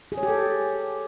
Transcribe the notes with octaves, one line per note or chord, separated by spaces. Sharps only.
G#4
C#5
G4
A4